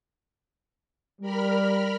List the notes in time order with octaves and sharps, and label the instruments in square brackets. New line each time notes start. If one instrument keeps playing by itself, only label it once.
[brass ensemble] G3 [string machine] A#4 B5 F6